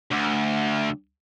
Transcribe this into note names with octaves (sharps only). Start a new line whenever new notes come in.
D2